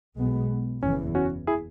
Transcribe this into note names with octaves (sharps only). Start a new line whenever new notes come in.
B1 B2 G#3 B3
F#1 E2 E3 C#4
C#4 F#4
E4 G#4